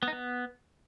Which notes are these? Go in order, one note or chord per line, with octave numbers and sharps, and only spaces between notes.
B3
D#4
B3